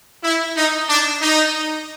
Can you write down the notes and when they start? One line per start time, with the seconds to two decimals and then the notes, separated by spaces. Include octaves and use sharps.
0.23 E4
0.56 D#4
0.88 D4
1.20 D#4